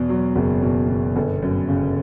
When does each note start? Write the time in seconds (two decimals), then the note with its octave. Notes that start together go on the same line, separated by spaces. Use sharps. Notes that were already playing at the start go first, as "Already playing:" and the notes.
Already playing: E2 B2
0.09 F#3
0.36 F#1
0.63 B2
0.89 B2
1.16 G1
1.42 F#2
1.69 C#3